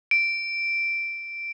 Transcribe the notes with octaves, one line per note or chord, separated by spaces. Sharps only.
D7